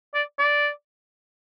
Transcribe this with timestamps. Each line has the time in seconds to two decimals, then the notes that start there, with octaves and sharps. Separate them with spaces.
0.14 D5
0.39 D5